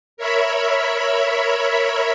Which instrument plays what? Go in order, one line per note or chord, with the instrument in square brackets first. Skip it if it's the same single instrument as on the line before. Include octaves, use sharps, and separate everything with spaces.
[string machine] A#4 C#5 E5 B5